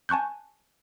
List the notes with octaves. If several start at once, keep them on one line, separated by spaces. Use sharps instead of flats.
G#5 A5 C#6 F#6 G6